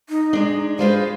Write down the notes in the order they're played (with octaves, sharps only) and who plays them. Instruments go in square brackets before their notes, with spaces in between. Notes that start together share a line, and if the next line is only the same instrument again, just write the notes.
[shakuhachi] D#4
[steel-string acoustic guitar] G#3 D4
[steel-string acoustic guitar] G#3 F4 B4 [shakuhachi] C5